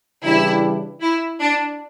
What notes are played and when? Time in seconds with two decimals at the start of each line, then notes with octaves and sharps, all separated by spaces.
0.24 C#3 E3 G3 D4 E4 G4
1.01 E4
1.40 D4